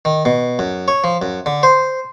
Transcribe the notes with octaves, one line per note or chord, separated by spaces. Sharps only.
D#3
B2
F#2
C#5
F3
F#2
D3
C5